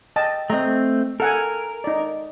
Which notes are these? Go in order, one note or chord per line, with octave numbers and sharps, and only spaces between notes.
D#5 G5 A5
A3 C4 D#5 A#5
A4 A#4 F#5 G#5
D#4 D5